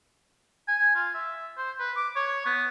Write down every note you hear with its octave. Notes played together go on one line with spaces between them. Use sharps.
G#5
F4
E5
C5
B4
D6
C#5
B3